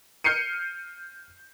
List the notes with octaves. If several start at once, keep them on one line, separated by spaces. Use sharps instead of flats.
F6 G6 C7 C#7 D#7